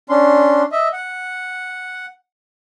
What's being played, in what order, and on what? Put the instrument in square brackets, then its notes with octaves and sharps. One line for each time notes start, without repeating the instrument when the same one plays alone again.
[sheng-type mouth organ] C#4 D4 C6
D#5 E5
F#5